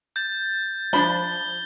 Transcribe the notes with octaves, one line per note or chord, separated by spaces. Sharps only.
G6 A6
F3 D4 B5 A6 G7